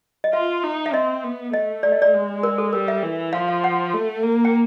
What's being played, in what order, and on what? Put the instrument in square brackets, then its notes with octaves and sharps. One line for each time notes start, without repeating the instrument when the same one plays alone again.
[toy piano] D#5
[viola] F4 [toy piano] E5
[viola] D#4
[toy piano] E5
[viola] C4 [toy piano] D#5
[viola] B3
[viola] A3 [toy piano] D#5
[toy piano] D5
D#5
D5
[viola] G#3
[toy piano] A#4
A4
[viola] G3 [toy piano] A#4
[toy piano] E5
[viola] E3
[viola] F3 [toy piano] F5
[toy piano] F5
F#5
[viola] A3
A#3
[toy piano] G5